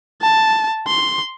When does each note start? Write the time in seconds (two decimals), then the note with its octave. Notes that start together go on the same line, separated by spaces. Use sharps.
0.22 A5
0.87 C6